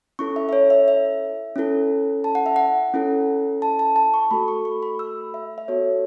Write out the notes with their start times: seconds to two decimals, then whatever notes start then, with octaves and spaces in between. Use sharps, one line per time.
0.19 C#4 E4 A4 C#6
0.36 E5
0.49 E5
0.53 C#5
0.70 E5
0.88 E5
1.56 C#4 E4 A4
2.24 A5
2.35 F#5
2.46 E5
2.56 F#5
2.94 C#4 E4 A4
3.62 A5
3.79 A5
3.96 A5
4.14 C#6
4.31 A3 F#4 A4 B5
4.48 C#6
4.65 C#6
4.83 B5
4.99 E6
5.34 E5
5.58 E5
5.68 B3 F#4 A4 C#5